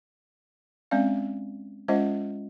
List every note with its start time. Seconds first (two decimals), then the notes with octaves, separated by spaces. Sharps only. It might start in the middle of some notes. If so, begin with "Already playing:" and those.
0.91 G#3 C4 C#4 D5 F5
1.88 G#3 C#4 F4 C5 D#5 F#5